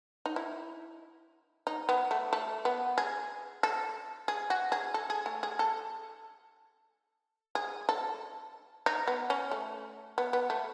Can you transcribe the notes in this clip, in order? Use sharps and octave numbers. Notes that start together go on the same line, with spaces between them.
D#4
E4
D#4
B3
A3
A3
B3
G#4
A4
G#4
F#4
G#4
A4
G#4
A3
G#4
A4
G#4
A4
D#4
B3
C#4
A3
B3
B3
A3